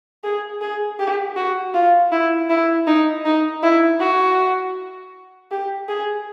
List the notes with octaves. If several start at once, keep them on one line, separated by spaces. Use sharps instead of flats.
G#4
G#4
G4
F#4
F4
E4
E4
D#4
D#4
E4
F#4
G4
G#4